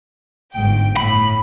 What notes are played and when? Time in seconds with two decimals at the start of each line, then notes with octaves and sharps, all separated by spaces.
0.53 G1 G#2 G5
0.97 A2 B5